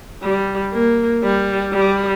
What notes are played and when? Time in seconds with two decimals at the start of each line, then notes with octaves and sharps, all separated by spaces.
0.23 G3
0.73 A#3
1.23 G3
1.73 G3